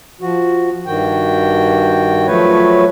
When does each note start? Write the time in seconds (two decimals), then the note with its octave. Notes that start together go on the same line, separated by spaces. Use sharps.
0.21 F3 F#4
0.86 G2 D#3 F#4 G5
2.27 F3 F#3 A3 B4 C#5